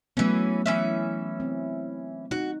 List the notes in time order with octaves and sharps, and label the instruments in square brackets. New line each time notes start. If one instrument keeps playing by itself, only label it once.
[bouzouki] E3 C#4 [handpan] F#3 A3 B3
[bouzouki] E3 C#4 E5
[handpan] C4
[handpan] D#4 [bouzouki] F#4